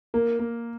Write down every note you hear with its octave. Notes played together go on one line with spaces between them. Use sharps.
A#3 A#4
A#3